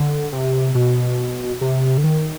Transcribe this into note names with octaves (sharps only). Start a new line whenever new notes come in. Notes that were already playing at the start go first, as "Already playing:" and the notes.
Already playing: D3
C3
B2
C3
D3
D#3